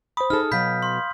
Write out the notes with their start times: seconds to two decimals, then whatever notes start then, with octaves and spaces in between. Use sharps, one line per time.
0.17 C5 B5 D#6
0.30 D#4 G#4 A4 F6
0.52 B2 F#3 F5 B5 G6 B6
0.82 C6